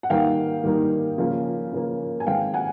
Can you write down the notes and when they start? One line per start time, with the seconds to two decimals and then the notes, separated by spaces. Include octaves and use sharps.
0.03 F#5
0.10 D#3 G3 A#3 D#4 F5 G5
0.63 D#3 G3 A#3 D#4
1.18 C#3 F3 A#3
1.73 C#3 F3 A#3
2.20 G#5
2.27 D#3 G#3 C4 F5 G5
2.54 F#5 G#5